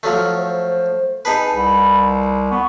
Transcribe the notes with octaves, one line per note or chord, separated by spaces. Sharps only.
F3 F#3 A3
C5
D#4 G#4 B4 A5
C2 B5
B3 C#6